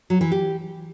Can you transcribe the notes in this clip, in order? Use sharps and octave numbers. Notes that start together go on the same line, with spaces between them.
F#3
E3
G4